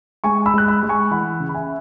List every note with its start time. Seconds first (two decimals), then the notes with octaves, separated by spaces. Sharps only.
0.24 G#3 G#5 C#6
0.46 B5 E6
0.54 G#3 F#6
0.68 B5 E6
0.83 G#3
0.89 G#5 C#6
1.11 E3 F#5 B5
1.40 C#3
1.49 B5
1.54 E5 G#5